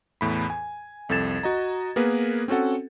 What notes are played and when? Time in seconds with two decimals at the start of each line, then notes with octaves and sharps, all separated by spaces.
0.21 E2 A2 B5
0.50 G#5
1.09 C2 F2 A4 G#6 A6 E7
1.43 F#4 D#5 A#5
1.96 A#3 B3 G#4 A#4 B4
2.48 C4 C#4 F#4 A4 F#5